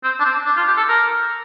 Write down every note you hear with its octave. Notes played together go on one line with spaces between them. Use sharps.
C4
D4
C4
D4
F4
G4
A4
A#4